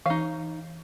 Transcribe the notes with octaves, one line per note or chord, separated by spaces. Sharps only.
E3 D#4 F5